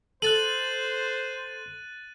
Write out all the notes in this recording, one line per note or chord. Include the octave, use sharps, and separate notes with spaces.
A4 C5 F#6 A6 D#7 F#7